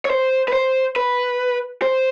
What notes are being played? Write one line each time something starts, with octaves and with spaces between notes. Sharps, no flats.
C#5
C5
B4
C5
B4
C5